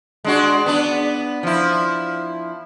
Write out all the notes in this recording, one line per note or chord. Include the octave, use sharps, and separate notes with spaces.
G#3 D4 F#4
B3 D4
F3 E4